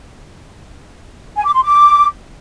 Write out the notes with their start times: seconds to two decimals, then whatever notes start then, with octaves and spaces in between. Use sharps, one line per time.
1.37 G#5
1.46 D6
1.54 C6
1.63 D6